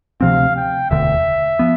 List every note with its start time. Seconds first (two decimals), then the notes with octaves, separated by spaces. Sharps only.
0.21 D2 C3 F3 C4 F5
0.56 G5
0.90 E1 D2 D3 E5
1.59 F3 B3